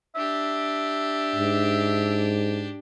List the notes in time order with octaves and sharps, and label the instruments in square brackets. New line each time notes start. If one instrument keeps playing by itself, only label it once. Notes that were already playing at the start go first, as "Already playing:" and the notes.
[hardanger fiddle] D4 G4 [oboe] E5
[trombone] G#2